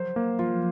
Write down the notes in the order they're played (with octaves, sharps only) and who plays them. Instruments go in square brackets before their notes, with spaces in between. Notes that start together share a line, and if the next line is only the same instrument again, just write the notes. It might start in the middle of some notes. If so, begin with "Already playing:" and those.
Already playing: [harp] F#3 [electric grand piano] C5
[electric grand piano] A#3
[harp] F3 [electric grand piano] F4